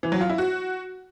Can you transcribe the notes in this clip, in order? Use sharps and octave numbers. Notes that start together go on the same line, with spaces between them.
E3
F#3
F4
E4
F#4